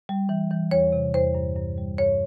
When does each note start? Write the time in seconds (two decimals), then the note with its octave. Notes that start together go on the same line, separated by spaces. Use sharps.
0.09 G3
0.29 E3
0.51 E3
0.71 E2 C#5
0.92 C3
1.14 E2 C5
1.34 G2
1.56 G2
1.78 G3
1.98 G2 C#5